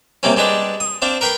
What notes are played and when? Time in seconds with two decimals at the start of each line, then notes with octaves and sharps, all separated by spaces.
0.23 C3 G3 A#3 C4 C#4
0.37 G3 G#3 D4 B4
0.80 D#6
1.02 C4 D4 F5
1.21 A#4 B4 G5 B5 C6